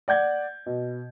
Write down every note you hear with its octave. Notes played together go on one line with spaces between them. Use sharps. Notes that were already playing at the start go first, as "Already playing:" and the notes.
D5 F#5 G6 G#6
B2